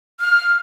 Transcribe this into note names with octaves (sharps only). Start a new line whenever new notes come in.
F6